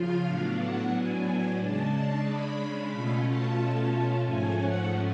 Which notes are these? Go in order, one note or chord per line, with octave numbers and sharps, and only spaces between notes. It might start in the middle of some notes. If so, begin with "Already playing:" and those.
Already playing: C#3 F3 F4 F5
A2 F#3 B3 D4
F#5
G#5
C#3 G#3 D4 A5
A5
B5
B2 A3 C#4 F4
A5
G#2 F3 A3 C#4 G#5
F#5